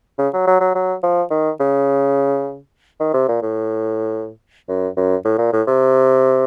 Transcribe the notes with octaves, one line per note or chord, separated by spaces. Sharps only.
C#3
F#3
F#3
F#3
F#3
F3
D#3
C#3
D#3
C3
A#2
A2
F#2
F#2
A2
A#2
A2
C3